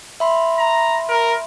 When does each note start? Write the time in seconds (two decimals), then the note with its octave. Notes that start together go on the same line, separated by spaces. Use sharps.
0.20 E5 B5 C6
0.59 A#5
1.09 A#4